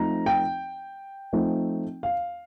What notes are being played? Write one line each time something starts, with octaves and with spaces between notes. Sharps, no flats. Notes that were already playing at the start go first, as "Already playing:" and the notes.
Already playing: F3 A3 C4 D#4 A#5
G5
F3 A3 C4 D#4
F5